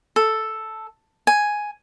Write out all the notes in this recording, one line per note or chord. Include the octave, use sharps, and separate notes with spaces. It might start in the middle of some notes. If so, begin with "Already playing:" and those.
A4
G#5